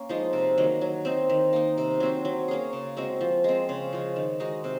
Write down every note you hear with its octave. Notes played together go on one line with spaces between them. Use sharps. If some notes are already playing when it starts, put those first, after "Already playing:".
Already playing: A#3 C#4
F3 G#3 D#4
C3
D#3 F#3 A#3
F#3
C4 D#4
D#3
A#3 D#4
C3
F#3 C4 F#4
F#3
A#3 C#4 G#4
C#3
G#3 C4 F#4
F3
G#3 C4
C#3
F3 G#3
D#3
G#3 D#4 F#4
C3